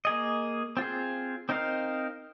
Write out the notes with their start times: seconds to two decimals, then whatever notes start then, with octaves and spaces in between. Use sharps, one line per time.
0.05 A#3 G#4 D#5
0.77 C4 F4 G#4
1.49 C4 D#4 A#4 F5